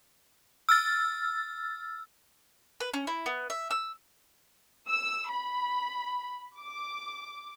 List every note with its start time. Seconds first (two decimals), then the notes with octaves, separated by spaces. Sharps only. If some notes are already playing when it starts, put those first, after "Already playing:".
0.69 E6 F6 A6
2.80 B4
2.94 C#4
3.07 E4
3.26 B3
3.50 E5
3.71 E6
4.88 E6
5.28 B5
6.58 D6